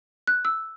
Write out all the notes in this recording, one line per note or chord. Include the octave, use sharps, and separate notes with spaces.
F#6
E6